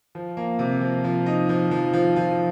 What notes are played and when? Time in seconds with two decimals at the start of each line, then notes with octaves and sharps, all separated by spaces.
0.15 F3
0.37 A#3
0.59 C3
0.81 F3
1.04 F3
1.26 D#4
1.49 F3
1.71 F3
1.93 F3
2.16 F3